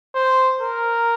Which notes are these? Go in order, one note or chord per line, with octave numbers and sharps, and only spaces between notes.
C5
A#4